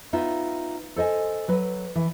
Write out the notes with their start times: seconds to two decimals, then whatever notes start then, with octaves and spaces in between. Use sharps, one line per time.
0.13 B3 D#4 F4 E5
0.96 A4 C5 D#5 G#5
1.48 F#3 B4
1.95 E3